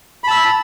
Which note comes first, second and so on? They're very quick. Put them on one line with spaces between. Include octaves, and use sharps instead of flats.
B5 A5 E6